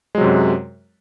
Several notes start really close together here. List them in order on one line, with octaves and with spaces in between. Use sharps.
G#3 F#3 C3 F#2